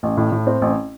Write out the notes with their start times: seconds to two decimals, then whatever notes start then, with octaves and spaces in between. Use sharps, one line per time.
0.03 A1
0.17 A2
0.32 A2
0.47 C4
0.62 A1